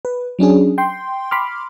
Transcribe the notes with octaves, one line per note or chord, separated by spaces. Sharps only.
B4
F#3 C#4 D4 G#4
G5 C6
B5 C6 D6 F6